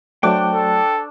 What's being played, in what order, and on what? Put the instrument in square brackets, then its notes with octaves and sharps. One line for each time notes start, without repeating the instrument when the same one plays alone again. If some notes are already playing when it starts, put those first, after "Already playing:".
[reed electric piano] F#3 A3 [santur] D4 C5 C#6 [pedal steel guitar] G5 D6
[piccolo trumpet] A4